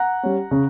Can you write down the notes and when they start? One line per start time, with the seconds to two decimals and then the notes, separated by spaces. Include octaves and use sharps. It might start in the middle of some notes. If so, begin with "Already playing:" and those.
Already playing: F#5 A#5
0.23 G3 C#4
0.51 C#3